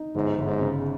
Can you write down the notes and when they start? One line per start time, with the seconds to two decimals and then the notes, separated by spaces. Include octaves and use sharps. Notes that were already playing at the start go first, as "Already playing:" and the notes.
Already playing: D#4
0.15 G1 G#2
0.38 G1
0.47 G#2
0.61 C#3